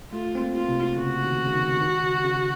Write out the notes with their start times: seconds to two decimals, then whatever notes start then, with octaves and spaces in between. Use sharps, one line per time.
0.12 A3 F4
0.35 C4
0.41 A#3
0.54 F4
0.69 C3
0.97 C#3 F#4
1.24 D#3
1.46 C#3
1.53 D#3
1.81 D#3
2.03 C#3
2.24 C#3